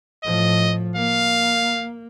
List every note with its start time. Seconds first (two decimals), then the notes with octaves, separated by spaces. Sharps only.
0.24 A2 F3 D#5
0.96 A#3 F5